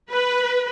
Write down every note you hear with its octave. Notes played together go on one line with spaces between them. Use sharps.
B4